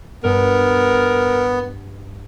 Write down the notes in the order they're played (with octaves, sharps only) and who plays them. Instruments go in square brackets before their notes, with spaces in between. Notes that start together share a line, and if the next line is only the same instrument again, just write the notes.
[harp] G2 [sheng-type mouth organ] B3 [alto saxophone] A#4